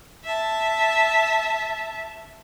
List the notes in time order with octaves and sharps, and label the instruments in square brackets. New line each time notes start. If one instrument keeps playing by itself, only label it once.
[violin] E5 A5